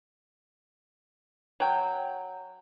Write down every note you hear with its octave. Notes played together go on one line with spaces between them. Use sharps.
F#3 G5